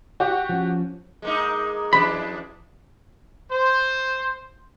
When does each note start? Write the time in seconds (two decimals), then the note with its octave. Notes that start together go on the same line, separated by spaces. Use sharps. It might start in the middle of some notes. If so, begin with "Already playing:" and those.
0.20 F#4 G4
0.49 F3 C#4
1.22 G#3 A#3 D#4
1.93 F2 E3 D4 B5
3.51 C5